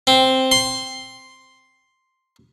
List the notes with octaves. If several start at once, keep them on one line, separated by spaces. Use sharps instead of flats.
C4
C6